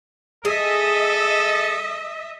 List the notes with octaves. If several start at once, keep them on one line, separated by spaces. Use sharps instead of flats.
G#4 A4 D#5 E5